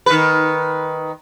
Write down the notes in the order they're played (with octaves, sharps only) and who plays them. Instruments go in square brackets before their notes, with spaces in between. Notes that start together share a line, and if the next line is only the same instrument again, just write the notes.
[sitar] D#3 B4